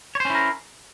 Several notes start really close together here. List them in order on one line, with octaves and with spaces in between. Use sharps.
C#5 C5 C#4 E4 A#4